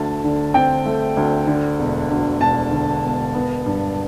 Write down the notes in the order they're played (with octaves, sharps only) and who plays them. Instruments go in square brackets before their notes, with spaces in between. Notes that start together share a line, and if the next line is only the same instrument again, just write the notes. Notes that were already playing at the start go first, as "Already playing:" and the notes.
Already playing: [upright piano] D2 A3 A5
D3
C4 G5
A3
D2
D3
E1
D2
E1 A5
D3
E1
B3
G2